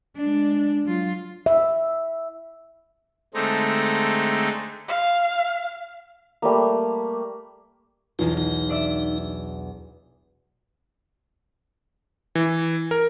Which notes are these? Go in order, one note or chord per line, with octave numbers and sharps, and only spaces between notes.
G#3 D4
F#3 F4
E5
D3 G#3 A3 C4 D#4
F5
G3 A3 A#3
B1 E2 D#4 F4
D#4
D4 D5 E5
E3
A#4